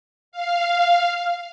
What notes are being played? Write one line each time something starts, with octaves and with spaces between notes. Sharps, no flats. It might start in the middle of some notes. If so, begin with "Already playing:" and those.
F5